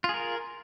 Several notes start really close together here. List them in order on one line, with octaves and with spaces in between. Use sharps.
F4 G#4 A#4